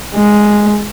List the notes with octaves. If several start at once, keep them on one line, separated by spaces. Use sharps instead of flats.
G#3